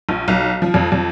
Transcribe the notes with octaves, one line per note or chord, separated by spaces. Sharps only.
A#1
B1
F3
F2
F2